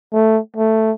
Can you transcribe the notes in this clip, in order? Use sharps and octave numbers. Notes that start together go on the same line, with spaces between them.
A3
A3